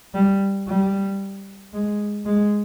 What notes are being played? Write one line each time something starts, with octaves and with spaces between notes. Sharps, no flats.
G3
G3
G#3
G#3